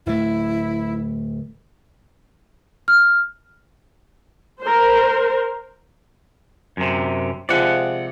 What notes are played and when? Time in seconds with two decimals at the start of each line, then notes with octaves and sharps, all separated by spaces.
0.06 D1 A3 E4
2.88 F6
4.61 A#4 C5
6.77 F#2 C3
7.49 C3 F3 G#3 D5 F#5